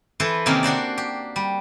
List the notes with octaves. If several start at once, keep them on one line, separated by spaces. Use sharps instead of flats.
E3 A4 B4 C5
C3 D#3 A#3 C#4 D#4
D4 F#4 C5 D5
G4
G3